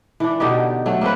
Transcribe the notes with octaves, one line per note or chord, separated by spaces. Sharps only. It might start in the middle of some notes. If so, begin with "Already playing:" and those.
E3 D4
B2 D3 D#4 G4
F#3 A3
A#3 C4 C#4 B4